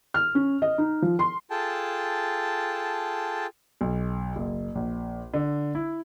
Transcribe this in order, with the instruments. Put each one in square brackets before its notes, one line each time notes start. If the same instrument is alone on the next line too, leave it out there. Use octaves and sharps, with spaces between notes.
[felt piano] F6
C#4
D#5
D#4
F3
C6
[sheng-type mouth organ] F4 G#4 A4 G5 A5
[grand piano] B1
F#1
A#1
D3
E4